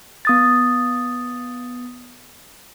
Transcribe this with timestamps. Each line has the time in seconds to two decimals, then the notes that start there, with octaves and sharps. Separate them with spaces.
0.25 B3 D#6 A6